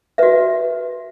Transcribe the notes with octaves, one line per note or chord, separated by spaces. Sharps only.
F#4 B4 E5